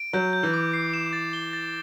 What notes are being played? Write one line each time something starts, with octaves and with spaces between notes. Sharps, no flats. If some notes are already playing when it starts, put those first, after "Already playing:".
Already playing: D7
F#3 G6
G6
E3
D6
C7
E7
A6
G7
A6